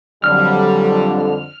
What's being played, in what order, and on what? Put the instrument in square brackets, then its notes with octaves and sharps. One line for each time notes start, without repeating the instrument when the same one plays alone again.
[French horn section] F2 D3 [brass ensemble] F#3 G3 [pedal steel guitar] F6